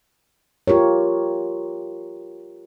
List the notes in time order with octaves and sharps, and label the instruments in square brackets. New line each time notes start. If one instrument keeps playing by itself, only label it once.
[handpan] F4 G4 A#4 C#5